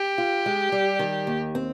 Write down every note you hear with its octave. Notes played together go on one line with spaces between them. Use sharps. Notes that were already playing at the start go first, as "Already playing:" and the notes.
Already playing: G4
F4
G#3
G3
D#3
D#2
C4